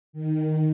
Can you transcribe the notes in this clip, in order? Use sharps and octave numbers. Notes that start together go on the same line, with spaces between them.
D#3